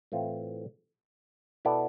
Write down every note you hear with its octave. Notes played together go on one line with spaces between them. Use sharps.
A2 E3 A3 C4 F4
B2 B3 E4 A4 D5